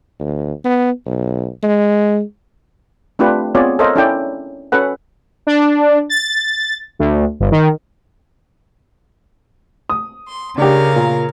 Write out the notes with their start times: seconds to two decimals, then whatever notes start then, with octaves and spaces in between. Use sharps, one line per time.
0.20 D2
0.65 B3
1.06 B1
1.63 G#3
3.19 A3 C4 D4 F4 G4 B4
3.55 B3 C4 F4 G#4 C#5 D5
3.79 A4 A#4 C5 C#5 D#5 F5
3.96 C#4 D4 E4 A4 D5 G5
4.72 C#4 F#4 A4 B4 F#5
5.47 D4
6.09 A6
6.99 D2
7.40 G1
7.52 D#3
9.90 D#6
10.27 C6
10.58 C#3 D4 G4 A#4 F5
10.96 A#2